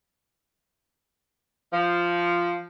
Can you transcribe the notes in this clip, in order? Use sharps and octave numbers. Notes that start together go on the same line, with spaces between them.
F3